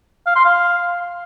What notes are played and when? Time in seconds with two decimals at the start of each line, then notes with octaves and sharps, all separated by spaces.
0.26 F5
0.36 C6
0.45 F5